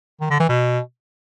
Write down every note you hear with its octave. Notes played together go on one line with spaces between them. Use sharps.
D#3
D3
E3
B2